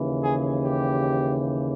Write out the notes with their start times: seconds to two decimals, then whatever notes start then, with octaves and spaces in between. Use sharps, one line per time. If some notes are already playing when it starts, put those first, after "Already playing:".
Already playing: D#2 C#3 E3
0.23 G#4
0.64 G4